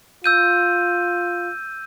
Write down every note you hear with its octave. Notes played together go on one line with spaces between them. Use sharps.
F4 E6 G6 D#7